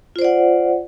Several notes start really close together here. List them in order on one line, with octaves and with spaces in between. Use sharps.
F4 C5 D5 F#5